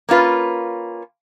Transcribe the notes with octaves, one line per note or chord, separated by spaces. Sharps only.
A#3 C#4 F4 B4